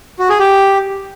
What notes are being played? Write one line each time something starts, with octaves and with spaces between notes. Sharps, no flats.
F#4
G#4
G4